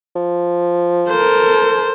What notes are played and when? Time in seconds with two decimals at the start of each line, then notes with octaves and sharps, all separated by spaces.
0.16 F3
1.09 A4 A#4 C5